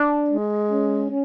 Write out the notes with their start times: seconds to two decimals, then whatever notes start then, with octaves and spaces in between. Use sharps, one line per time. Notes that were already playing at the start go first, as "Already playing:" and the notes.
Already playing: D4
0.29 G#3
0.69 C#4
1.08 C#4